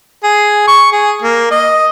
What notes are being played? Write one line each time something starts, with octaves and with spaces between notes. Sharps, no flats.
G#4
C#6
G#4
A#3
D#5